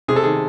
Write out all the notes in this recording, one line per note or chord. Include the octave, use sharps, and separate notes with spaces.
C3 G#4
A4
D#3 G#4